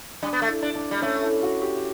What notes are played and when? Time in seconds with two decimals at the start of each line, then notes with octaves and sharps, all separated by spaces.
0.23 G3 D4
0.33 B3
0.42 A3
0.49 E4
0.62 D4
0.75 D4
0.91 G3
1.02 A3 C#4
1.22 E4
1.43 F#4
1.62 G4